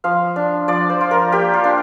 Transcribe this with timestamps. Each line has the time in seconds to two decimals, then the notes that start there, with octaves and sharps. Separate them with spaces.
0.04 F3 F5
0.36 D4
0.68 F3 D5
0.90 C5
1.01 F4
1.11 A#4
1.32 A#3 G4
1.54 F4
1.64 D4